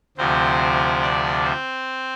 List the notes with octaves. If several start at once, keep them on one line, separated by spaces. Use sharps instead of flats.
D2 C3 F3 C4 C5
D4 D5
C4 C5